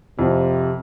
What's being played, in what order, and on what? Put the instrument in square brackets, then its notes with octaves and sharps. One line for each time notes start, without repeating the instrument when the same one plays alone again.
[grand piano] F2 [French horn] C3